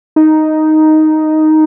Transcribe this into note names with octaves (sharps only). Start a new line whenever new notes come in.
D#4